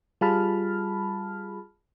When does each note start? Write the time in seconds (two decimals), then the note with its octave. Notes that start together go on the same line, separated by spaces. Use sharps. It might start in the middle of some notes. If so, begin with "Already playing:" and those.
0.21 G3 F4 G#4 A5 B5 F6